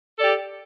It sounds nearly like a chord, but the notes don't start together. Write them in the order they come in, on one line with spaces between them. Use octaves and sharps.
A4 D5 G4